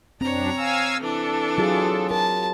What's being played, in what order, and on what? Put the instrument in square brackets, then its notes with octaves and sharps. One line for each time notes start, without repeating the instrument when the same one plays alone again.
[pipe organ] F#2 D4 [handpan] C4 [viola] C#5 A#5
[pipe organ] F5 G#5 E6
[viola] E3 D4 [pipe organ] A4
[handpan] F#3 F4 G#4
[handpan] A#4 [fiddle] A5